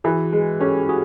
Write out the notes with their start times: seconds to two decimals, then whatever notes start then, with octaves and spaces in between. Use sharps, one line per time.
0.04 E3 F#4 G#4
0.33 G#3
0.60 C#4 G4 A4
0.89 F#4 G#4